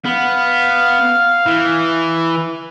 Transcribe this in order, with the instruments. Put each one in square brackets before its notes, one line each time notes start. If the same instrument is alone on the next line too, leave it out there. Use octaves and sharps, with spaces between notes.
[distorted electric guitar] B3 [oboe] F5
[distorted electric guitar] E3